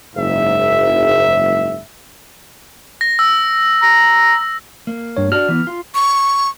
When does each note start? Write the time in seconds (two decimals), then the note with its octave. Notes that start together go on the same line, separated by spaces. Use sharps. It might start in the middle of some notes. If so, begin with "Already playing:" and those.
0.16 F#1 G#2 E5
3.01 A#6
3.19 E6
3.82 A#5
4.87 A#3
5.17 G2 C#5
5.32 D4 F#4 F6
5.48 E3 B3
5.67 F4
5.95 C#6